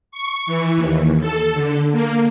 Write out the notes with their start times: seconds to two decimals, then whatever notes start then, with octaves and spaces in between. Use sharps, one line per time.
0.11 C#6
0.47 E3
0.77 D#2
1.21 A4
1.54 D3
1.92 A#3